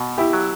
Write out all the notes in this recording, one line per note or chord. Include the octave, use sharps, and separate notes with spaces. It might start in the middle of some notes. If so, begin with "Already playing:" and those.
Already playing: B2
E4 G4
F#3